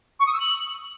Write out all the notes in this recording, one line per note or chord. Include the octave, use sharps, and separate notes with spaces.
C#6
D#6
E6
F#7